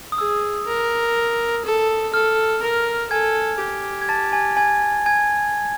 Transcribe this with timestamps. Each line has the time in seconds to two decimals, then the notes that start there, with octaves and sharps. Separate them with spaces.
0.12 D#6
0.18 G#4 E6
0.67 A#4
1.65 A4
2.13 A4 F6
2.62 A#4
3.11 A4 G#5 G#6
3.60 G4
4.02 G#6
4.09 A5 A6
4.33 G#5 G#6
4.57 G#5 G#6
5.06 G#5 G#6